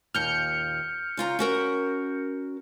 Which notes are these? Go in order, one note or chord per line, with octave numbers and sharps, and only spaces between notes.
D#2 A#2 F6 G6 C#7
C#3 F4 A#5
C#4 F#4 A#4